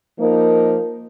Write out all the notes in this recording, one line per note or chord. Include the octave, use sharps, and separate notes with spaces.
F3 A#3 D#4 A#4